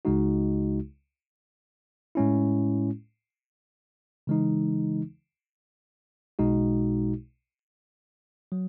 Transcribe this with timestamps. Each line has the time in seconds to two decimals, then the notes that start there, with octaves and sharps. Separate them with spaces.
0.05 C#2 C#3 G#3 D#4 F#4
2.15 A2 G#3 C#4 E4
4.27 C#3 E3 G#3 D#4
6.39 B1 B2 G#3 D#4 F#4
8.52 F#3